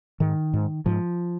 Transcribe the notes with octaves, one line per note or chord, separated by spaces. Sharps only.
G#2 D#3
G#2
G#2 F3